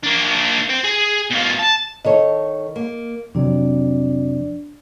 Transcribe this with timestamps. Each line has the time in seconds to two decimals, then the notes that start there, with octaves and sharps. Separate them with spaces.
0.04 A#3 D4
0.69 C5 G5
0.84 G#4
1.30 B2 F4
1.59 A5
2.05 D#3 A4 C#5 D#5
2.76 A#3
3.35 F2 C3 F#3 D4 D5